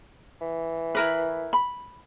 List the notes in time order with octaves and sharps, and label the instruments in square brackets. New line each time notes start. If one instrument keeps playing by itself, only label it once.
[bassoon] E3
[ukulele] E4 A#4 B4
B5